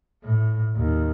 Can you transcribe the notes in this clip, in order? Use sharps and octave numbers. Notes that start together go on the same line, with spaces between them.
A2
D#2